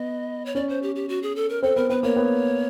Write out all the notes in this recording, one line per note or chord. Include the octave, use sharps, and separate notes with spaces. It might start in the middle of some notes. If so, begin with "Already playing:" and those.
Already playing: B3 D#5
C#5
C#4 D5
C5
G4
G4
F#4
G#4
A4
A#4
C4 A4
B3 A#4
B3 B4
A#3 C#5
B3